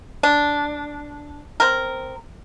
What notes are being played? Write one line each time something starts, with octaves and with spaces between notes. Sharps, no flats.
D4
C4 A#4